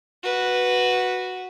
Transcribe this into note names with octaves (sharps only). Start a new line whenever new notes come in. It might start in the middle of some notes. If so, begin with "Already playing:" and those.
F#4 B4